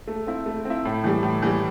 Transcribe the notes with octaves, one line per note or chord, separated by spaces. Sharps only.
A3
C4 E4
A3
C4
E4
A2
E3 G3
A2
E3 G3